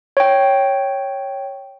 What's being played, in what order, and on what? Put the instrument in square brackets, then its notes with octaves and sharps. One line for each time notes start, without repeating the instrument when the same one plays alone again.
[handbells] C#5 G5